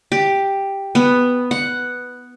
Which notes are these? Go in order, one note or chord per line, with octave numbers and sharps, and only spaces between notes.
G4
B3
F#5